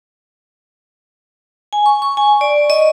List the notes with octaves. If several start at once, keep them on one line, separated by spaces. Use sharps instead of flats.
G#5
C#6
C#6
G#5
D5
D#5